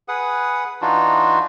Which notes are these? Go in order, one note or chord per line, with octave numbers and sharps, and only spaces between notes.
G#4 B4 F#5 D#6
E3 D4 D#4 F4 F#4